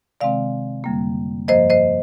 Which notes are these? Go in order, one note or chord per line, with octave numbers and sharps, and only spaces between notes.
C3 D#3 G#3 C4 D5 F5
F2 D3 G3 A#3
G2 F3 A#3 C5 D#5
C5 D#5